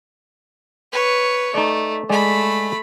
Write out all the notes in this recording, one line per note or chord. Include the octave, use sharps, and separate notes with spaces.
B4 C#5
A3 D#4 D5
G#3 A3 G#4 D5 B5